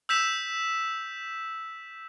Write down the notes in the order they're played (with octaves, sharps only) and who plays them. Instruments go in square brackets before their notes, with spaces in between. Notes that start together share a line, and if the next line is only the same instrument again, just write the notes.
[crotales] E6 G6 B6 E7 F7